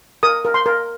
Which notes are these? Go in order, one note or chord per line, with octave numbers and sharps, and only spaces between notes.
A#4 D#6
A#4
C6
A#4